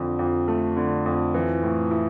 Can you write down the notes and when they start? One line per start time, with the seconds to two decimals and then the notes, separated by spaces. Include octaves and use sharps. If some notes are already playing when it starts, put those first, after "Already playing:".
Already playing: F2 D3
0.19 F2
0.48 A3
0.76 D3
1.06 F2
1.34 E3
1.63 A2
1.91 E4